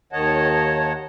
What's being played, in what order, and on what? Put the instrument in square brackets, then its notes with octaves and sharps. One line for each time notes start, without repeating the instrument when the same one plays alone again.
[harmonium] D#2 D#3 C#5 D#5 F#5 A5